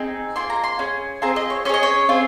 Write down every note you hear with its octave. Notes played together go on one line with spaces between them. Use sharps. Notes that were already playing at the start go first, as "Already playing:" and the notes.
Already playing: C4 D#4 G#4
A#3 F4 G#4 C6
A#5
C6
C#4 G#4
C4 F4 G#4 A#5
D#5
C#5
C#4 F4 G#4 C#5 D#5
C#5
C4 F4 G#4